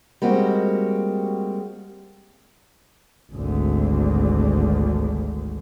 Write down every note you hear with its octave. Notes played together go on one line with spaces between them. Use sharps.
G3 G#3 A#3 C4 F#4
G#1 D2